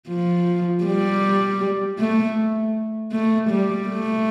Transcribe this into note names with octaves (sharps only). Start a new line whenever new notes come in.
F3
G3
A3
A3
G3
A3